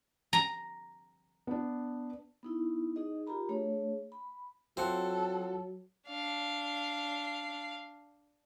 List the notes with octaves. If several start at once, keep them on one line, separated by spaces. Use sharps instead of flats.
A#5
B3 D4
B3 D#4 E4
D#4 G#4 D#5
F4 G4 A#4 A#5 B5
A3 D4 G#4 C#5
B5
F#3 C4 F4 A4 F#5
D4 F5